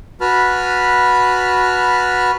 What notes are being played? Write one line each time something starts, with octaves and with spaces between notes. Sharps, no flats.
F#4 B4 A5 B5 F6